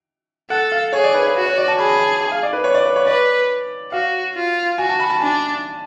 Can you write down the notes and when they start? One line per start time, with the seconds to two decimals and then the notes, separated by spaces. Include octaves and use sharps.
0.50 A4 F#5
0.72 F5
0.93 G#4 C#5
1.04 D5
1.14 B4
1.25 B4
1.36 F#4
1.46 C#5
1.57 D5
1.68 A5
1.78 G#4 B5
1.89 B5
1.99 A5
2.21 G#5
2.32 F5
2.43 D5
2.53 B4
2.64 C#5
2.74 D5
2.86 B4
2.96 C#5
3.07 B4 D5
3.92 F#4 F5
4.35 F4
4.78 F#4 G#5
4.89 A5
5.00 B5
5.10 A5
5.20 D4 G#5